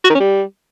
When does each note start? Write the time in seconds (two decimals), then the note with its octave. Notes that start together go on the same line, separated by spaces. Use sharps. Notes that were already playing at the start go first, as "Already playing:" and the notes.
0.04 F#4
0.09 D#3
0.15 C#4
0.20 G3